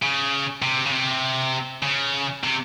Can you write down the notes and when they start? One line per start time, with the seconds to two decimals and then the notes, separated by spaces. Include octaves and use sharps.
0.02 C#3
0.62 C3
0.86 C#3
0.92 C3
1.83 C#3
2.43 C3